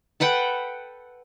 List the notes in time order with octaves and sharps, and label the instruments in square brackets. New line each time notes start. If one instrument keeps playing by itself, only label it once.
[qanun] A4 B4 F#5 G5